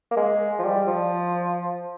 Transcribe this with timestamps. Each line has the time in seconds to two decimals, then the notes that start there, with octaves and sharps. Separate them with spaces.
0.11 A#3
0.16 G#3
0.59 F3
0.64 G3
0.88 F3